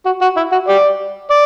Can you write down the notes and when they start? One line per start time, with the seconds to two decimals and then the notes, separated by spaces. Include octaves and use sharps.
0.05 F#4
0.21 F#4
0.37 E4
0.52 F#4
0.69 G4 D5
1.31 D5